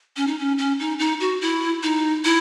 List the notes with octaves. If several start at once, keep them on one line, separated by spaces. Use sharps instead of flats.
C#4
D#4
C#4
C#4
D#4
D#4
F#4
E4
D#4
E4